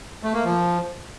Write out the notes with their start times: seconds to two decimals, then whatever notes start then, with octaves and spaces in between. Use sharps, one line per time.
0.23 A3
0.34 A#3
0.44 F3